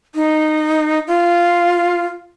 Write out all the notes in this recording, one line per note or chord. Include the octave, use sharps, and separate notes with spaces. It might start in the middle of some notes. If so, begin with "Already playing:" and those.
D#4
F4